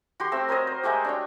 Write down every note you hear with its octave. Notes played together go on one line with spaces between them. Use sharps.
F#4 G4 C6
A3 C4 E6
A#4 C5 C#5 D#5
C5
G#3 A3 F#4 G4
D4 C#5 G5